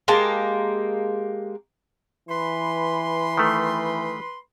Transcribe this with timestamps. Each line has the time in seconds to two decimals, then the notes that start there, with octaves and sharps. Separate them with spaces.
0.08 G#3 A#3 G4 A5
2.29 E3 B4 B5 C6
3.37 D#3 A3